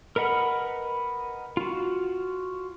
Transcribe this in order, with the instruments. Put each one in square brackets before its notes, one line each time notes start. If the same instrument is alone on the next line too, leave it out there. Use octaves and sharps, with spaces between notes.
[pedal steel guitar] A#4 B4 D#5 F#5 B5
F4 F#4